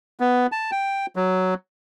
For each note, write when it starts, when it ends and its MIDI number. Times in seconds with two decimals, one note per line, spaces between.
0.20 0.47 59
0.52 0.71 81
0.72 1.06 79
1.16 1.54 54